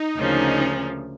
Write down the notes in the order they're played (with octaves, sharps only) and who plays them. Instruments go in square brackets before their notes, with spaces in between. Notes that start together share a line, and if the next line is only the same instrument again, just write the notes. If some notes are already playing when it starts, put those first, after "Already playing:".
Already playing: [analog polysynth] D#4
[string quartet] D2 C#3 F3 A#3 C#4